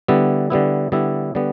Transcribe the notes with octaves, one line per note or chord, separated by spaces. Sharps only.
D3 G3 B3 E4
D3 G3 B3 E4
D3 G3 B3 E4
D3 G3 B3